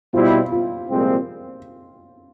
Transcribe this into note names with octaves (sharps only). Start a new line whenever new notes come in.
B2 G3 C4 E4 F4
F4
C2 A#2 F3 G#3 C4